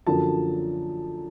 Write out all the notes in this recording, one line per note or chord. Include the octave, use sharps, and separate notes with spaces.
F#2 D3 F3 A#3 A5